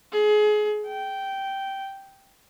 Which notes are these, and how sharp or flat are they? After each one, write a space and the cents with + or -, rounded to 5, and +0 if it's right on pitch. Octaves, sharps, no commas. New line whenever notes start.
G#4 +25
G5 -10